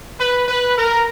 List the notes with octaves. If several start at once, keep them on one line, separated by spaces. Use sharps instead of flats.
B4
B4
A#4